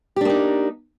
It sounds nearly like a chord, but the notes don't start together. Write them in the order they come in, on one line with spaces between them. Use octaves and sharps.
G4 D4 A#3 D#4